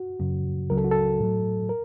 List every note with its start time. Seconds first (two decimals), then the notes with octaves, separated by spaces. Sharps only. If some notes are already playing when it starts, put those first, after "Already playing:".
Already playing: F#4
0.20 F#2 C#3 F#3
0.70 C#2 C#3 F#3 A#4
0.78 A4
0.84 F#4
0.91 A4
1.20 A2 F#3
1.69 A#4